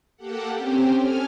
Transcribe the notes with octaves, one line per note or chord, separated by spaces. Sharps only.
A#3 G4 A4 F#5
C4 C#4 G4 C5
A4 G#5 F6